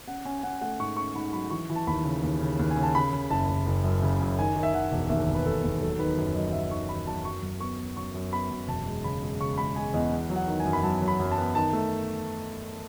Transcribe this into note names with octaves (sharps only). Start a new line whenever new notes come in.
C#4 F#5
C#4 G#5
G#5
C#4 F#5
A3 F#5
G#2 C#6
C#4 C#6
G#2 B5
F#3 B5
E3 C#6
E3
A5
D#2 B5
C#3
D#2
C#3
D#2
G#5
C#3
A5
C#3 B5
C#3
F#1 A5
F#1
F#1
F#2
C#3
F#2
D#3 G#5
D#3
E5
D#3 F#5
E1
D#2 E5
E1
B4
E1 A4
D#2
F#3 A4
D#3 B4
F#2
F#3 D#5
F#3 E5
D#3 C#6
D#3 B5
F#3 A5
F#2 C#6
F#2
B3 C#6
B3
F#2 C#6
F#2
B3 B5
F#2
E1 A5
G#3
C#3 B5
G#3
C#3 C#6
G#3 B5
G#3 G#5
E2 D#5
B3
F#3
F#5
D#3
G#5
F#2
B5
F#3 A5
F#3
B5
F#2
A5
B3
D#3 A5
A3